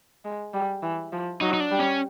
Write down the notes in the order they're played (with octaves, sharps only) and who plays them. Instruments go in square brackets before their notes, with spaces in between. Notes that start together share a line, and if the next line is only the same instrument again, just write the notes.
[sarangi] G#3
G3
E3
F3
[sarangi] F#3 [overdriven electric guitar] D#4
[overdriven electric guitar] D#4
D4
[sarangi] G3
[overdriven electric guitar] C#4